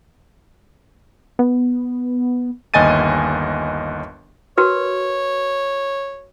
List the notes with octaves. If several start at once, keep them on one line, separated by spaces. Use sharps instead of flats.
B3
G1 D#2 D#5 G#5 A6 D#7
F#4 A#4 B4 C#5